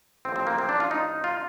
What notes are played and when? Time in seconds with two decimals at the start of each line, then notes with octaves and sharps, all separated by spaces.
0.25 A1 A2 F3 C4
0.36 C4
0.47 A#3
0.58 C4
0.69 D4
0.80 F4
0.91 D#4
1.24 F4